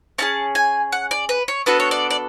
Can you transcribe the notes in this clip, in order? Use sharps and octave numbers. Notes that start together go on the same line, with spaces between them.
C#4 E4 G#4 A5
G#5
F#5
D5
B4
C#5
B3 D4 F#4 A4 B4
C#5
D5
D5